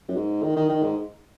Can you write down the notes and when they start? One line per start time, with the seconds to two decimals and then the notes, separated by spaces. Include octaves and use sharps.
0.09 F#2
0.16 G#2
0.43 D#3
0.56 D#3
0.69 D#3
0.83 G#2